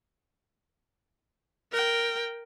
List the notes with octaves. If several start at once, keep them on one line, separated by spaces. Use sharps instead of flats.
A#4 G5